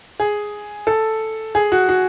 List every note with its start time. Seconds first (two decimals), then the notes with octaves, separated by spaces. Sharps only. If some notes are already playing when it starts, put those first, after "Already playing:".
0.20 G#4
0.87 A4
1.55 G#4
1.72 F#4
1.89 F#4